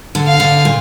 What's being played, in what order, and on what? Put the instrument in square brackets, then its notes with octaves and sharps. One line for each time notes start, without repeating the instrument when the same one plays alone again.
[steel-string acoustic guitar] D3
[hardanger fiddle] F5
[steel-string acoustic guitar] D3
A#2